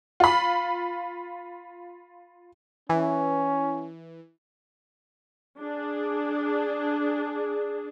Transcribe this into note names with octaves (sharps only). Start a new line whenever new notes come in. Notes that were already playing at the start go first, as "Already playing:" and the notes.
F4 B5
E3 C#4
D4 G#4